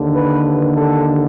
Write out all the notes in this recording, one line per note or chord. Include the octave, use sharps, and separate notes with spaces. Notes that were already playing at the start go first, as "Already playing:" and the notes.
Already playing: D#2 D3
B4
A4